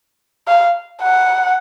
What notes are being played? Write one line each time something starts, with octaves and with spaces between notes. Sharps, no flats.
F5
F#5